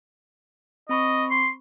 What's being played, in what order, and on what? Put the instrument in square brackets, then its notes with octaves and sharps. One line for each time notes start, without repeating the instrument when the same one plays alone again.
[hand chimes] C4 B5 C#6 [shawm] D#5
[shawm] C6